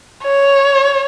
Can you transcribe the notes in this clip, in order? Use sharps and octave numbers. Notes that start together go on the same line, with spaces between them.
C#5